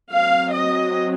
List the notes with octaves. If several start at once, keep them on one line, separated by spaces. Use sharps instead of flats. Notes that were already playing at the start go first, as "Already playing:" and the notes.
F#3 C4 F5
D#5